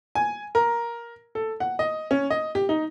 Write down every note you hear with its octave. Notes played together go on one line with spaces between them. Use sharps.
G#5
A#4
A4
F#5
D#5
C#4
D#5
G4
D#4